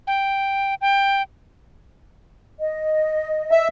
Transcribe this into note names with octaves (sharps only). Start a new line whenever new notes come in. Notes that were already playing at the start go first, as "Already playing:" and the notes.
G5
G5
D#5
E5